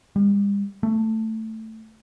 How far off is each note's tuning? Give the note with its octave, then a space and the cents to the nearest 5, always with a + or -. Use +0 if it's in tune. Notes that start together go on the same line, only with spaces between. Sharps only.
G3 +45
A3 +10